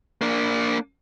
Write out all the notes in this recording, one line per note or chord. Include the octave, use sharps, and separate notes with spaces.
A#3 D4